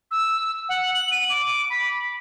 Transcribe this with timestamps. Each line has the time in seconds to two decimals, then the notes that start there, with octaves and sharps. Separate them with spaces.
0.11 E6
0.69 F#5
0.94 F#7
1.12 D#7
1.30 D6
1.70 B5